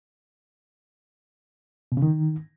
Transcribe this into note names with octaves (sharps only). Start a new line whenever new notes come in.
B2
C#3
D#3